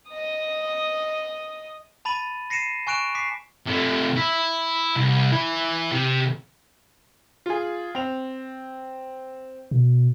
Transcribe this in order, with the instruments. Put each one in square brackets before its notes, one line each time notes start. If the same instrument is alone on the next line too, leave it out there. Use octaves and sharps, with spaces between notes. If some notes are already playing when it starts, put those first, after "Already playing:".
[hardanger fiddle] D#5 D#6
[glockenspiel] A5 B5 A6 D#7 F#7
A#6 C7 C#7 D#7 E7
G#5 C#6 F#6 D7 E7 F7
D6 B6 C7
[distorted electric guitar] C3 A3
E4
C2
E3 E4
C3
[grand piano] F4 G#4
C4 F7
[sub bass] B2